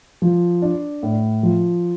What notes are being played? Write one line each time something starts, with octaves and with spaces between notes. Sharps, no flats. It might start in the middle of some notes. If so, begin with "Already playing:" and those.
F3
D4
A2
F3